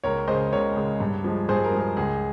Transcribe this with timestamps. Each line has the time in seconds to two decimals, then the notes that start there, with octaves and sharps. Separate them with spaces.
0.04 C#2 A#4 C#5
0.28 C#3 G#3 C5 D#5
0.52 C#2 A#4 C#5
0.76 C#3 G#3
1.00 G2
1.24 F3 G#3
1.49 G2 G#4 C5
1.64 A#4
1.73 F3 G#3
1.80 A#4
1.97 C#2 G#4